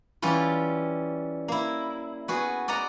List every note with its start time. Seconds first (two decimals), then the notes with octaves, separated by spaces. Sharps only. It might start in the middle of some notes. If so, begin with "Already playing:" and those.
0.22 E3 G3 C#4 F4
1.48 A#3 E4
2.28 B3 F#4 G#4
2.68 D5 D#5 F#5 A#5